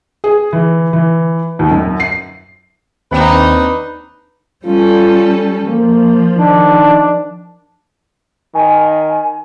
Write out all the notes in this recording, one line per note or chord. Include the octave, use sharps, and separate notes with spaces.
G#4
E3
E3
D#2
F#2
C7
D#2 C4 D4 D#4 B4
G3 C#4 F4 A4
F3 A#3
D#3 D4
D#3 G#5